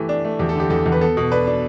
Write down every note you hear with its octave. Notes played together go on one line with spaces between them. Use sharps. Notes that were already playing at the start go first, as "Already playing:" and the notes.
Already playing: E3 A3 G4
D4
A3
E2 G4
A4
D3 G4
E2 A4
E2
B4
B3 A4
B2
D4 B4
D4